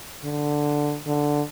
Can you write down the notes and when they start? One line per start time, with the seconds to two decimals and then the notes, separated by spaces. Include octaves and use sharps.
0.25 D3
1.07 D3